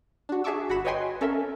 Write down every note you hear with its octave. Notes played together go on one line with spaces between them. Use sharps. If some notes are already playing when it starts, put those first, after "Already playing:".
D4 F#4
G#4 E5 A5 C#6 D6 E6
G1 F#4 F#5 B5 B6 E7
B4 C#5 D#5 G5 G#5 C6
C#4 A4 A#4 E5